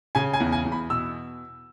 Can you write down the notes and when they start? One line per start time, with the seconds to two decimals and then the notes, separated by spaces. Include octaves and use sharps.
0.15 C#3 G#5
0.33 G#5
0.40 E2
0.52 G#5
0.65 E2
0.72 B5
0.90 B2 E6